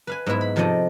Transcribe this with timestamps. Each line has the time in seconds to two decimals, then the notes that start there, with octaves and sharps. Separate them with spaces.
0.07 B4 F5 G#5
0.26 G#2 F#3 B3 E4 E5
0.41 B5
0.56 C3 F3 D#4 A4 D5 D#5